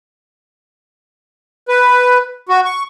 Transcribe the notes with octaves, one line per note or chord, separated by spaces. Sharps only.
B4
F#4
C#6